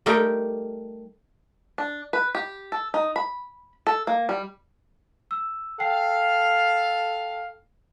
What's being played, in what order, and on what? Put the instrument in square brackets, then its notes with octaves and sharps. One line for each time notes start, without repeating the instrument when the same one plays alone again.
[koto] G3 A3 D#4 G4 A#4
[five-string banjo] D4
B4
G4
A4
D#4
B5
A4
A#3
G3
[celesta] E6
[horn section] A4 F5 [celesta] G5 C7